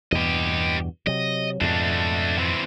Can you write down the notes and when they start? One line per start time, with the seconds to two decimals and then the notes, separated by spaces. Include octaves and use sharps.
0.12 E2 G2 B2 G4 D#5
1.07 C3 F#3 D#5
1.61 F2 G#2 B2 A3 D4
2.38 E3 C4